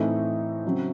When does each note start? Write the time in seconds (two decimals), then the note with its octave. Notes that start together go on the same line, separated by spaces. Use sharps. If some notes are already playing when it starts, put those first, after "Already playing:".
Already playing: A2 E3 A3 C4 D#4
0.64 C#3 F#3 C4